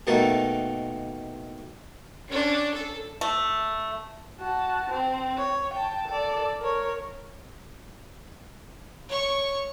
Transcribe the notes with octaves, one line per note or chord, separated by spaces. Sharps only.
B2 D#3 A3 A#3
C#4 D4
A4
A3
F#4 A5
C4
C#5
G5 A5
A4 D5
A#4 C#5
C#5 C#6